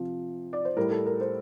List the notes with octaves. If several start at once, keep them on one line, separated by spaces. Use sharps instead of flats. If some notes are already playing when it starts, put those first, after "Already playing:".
Already playing: C3 F3
D5
C5
A2 G3 A#4
A4
A#4
C5